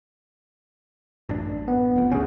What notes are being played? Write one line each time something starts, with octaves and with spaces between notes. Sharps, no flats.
A1 F#2 D4
B3
F1 F2
G#1 D2 C#4 G#4